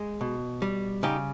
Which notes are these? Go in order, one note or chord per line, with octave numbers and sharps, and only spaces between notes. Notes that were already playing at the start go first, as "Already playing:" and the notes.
Already playing: G#3
B2
G3
C#3 D#4 G4